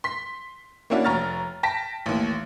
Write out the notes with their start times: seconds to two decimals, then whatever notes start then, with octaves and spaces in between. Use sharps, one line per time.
0.04 C6 B6
0.90 A#3 C#4 D4 E4 F#4
1.05 F1 C#5 A#5 C#6 F6 A6
1.63 G5 A5 A#6 B6
2.06 A1 D#2